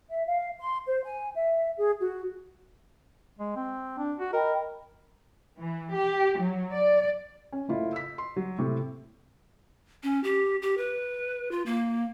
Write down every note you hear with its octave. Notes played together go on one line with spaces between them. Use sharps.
E5
F5
C6
C5
G#5
E5
G#4
F#4
G#3
C4
D4
F#4
A#4 D#5 G5 B5
E3
G4
F#3
D5
C#4
F#1 A2 E4 F4
E6 B6
C6
F#3
A2 C3 C#6
C#4
G4
G4
B4
F4
A#3